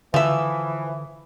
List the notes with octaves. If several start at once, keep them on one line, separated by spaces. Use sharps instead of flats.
D3 E3 F3 E5